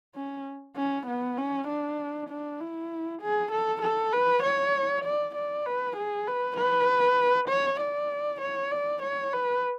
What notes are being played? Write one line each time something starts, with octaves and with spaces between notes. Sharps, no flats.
C#4
C#4
B3
C#4
D4
D4
E4
G#4
A4
A4
B4
C#5
D5
D5
B4
G#4
B4
B4
C#5
D5
C#5
D5
C#5
B4